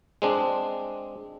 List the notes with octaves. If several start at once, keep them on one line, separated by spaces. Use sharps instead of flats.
G#3 C4 D4